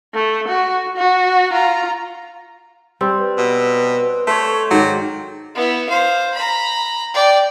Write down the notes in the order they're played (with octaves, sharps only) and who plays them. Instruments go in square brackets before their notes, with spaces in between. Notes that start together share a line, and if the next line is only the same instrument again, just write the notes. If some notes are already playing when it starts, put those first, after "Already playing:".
[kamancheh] A3
F#4
F#4
F4 A#5
[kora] G3 [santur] C4
[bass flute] B4
[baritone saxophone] B2
[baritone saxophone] A3 [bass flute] A4 [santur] C5 C#5
[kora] G#2 D#3 D5 [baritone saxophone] F#3
[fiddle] B3 E4
C5 F5
A#5 B5
D5 G5